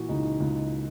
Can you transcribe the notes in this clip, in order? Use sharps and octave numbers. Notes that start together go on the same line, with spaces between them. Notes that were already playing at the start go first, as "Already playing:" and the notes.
Already playing: A#2 E3 F#4
C#2 D#4
C#2